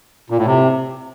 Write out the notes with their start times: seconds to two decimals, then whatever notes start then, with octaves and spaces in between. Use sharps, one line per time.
0.30 A#2
0.38 A2
0.46 C3